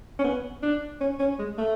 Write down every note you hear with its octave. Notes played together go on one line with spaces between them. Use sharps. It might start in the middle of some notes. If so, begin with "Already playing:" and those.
C#4
B3
D4
C#4
C#4
G#3
A3